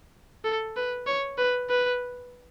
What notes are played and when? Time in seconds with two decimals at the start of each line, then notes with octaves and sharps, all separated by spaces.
0.44 A4
0.76 B4
1.07 C#5
1.38 B4
1.70 B4